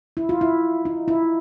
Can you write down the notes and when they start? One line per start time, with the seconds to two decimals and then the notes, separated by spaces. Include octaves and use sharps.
0.17 E4
0.29 F4
0.41 E4
0.85 D#4
1.08 E4